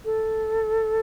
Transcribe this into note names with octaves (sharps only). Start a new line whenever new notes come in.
A4